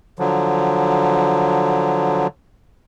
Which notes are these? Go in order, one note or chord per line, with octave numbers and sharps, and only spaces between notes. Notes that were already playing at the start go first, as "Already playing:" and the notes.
D3 F3 F#3